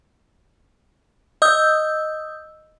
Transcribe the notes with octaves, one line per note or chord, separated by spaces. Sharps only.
D#5 D#6 E6 G6